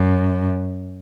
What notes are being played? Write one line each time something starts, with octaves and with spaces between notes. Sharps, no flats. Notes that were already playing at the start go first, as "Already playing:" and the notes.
Already playing: F#2